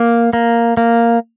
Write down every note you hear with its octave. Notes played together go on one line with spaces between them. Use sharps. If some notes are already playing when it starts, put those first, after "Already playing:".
Already playing: A#3
A#3
A#3